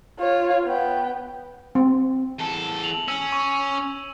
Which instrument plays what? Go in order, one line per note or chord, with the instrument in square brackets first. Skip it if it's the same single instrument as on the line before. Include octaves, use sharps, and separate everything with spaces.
[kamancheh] F4 C#5
B3 G5
[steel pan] C4
[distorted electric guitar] E2 A4
[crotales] F7 F#7
[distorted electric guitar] C#4 [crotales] E6
[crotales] C#6